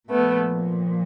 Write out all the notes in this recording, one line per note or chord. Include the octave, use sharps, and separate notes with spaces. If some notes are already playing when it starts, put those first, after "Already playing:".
A#2 F3 A3 B3